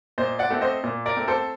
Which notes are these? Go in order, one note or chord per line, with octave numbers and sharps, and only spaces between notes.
A#2 C5 D#5
D5 F#5
A3 C4
C5 D#5
A#2
A#4 D5
A3 C4
A4 C5